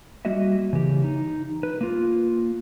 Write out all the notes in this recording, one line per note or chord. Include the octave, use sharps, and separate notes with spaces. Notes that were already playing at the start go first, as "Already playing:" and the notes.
G3 A#3 F#4 D#5 E5
C#3 E3 G4
D#4
B4
A#3 F4